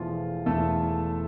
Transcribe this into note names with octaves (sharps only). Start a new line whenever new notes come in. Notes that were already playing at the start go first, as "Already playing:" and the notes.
Already playing: E1 E2 E3 F3 A3 F4
E1 E2 E3 A3 A4